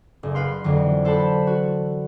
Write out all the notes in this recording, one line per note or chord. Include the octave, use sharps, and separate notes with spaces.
F#1
B4 F5 C6
F2 D3 E3 F#3
A4 C5 F#5 A5 B5
F#4